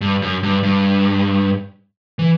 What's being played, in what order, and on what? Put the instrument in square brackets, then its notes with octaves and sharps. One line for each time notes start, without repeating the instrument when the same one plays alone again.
[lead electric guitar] G2
F#2
G2
G2
E3